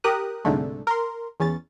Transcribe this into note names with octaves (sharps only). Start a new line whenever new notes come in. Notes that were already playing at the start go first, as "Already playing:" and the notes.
G4 A#4 D#6 F#6
C2 G#2 D3 A3
A#4 C6
E2 C#4 A6